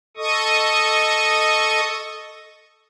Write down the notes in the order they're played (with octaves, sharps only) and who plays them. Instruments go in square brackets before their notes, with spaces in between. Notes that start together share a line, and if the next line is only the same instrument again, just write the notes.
[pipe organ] A4 D#5 C#6 D#6